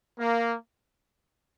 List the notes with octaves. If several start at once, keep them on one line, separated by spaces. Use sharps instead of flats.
A#3